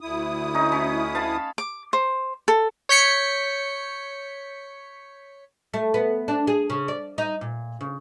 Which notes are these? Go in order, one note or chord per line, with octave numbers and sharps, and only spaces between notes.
D2 E4 D#6
C#4 D#4
C#4
F5 A5 B5
D6
C5
A4
C#5 G6 B6 C#7
A3
B3
D4
G#4
C#3
D5
D#4
A#2
C#3